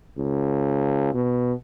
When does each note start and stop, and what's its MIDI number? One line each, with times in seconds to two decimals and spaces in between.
0.18 1.10 37
1.14 1.53 47